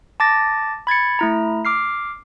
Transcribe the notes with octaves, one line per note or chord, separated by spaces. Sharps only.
A5 D6 A6 A#6
B5 G#6 A6 C#7
A3 E4 A#5
D6 F6 C7